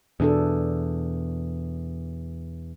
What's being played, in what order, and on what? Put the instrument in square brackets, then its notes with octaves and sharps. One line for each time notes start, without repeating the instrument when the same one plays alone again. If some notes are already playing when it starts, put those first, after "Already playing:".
[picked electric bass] E2 [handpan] B2 D4 A4